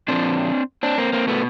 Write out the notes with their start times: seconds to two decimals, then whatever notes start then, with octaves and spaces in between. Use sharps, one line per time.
0.08 A#2 F3 C4 D4
0.83 C4 D4
0.98 A#3 C4
1.13 A#3 C4
1.27 B2 A3 B3